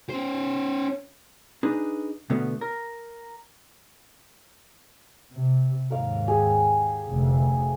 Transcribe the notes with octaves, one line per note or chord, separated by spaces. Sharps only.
C#4 C5
D4 D#4 G#4 B4
B2 D3 A3 B3
A#4
C3
D#2 G#2 A#4 F5
G4 G#4
F1 D2